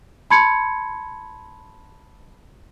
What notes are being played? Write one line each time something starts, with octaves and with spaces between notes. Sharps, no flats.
A5 B5 C6 G#6 C#7